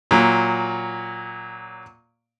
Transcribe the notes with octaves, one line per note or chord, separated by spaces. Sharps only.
A#2 F#3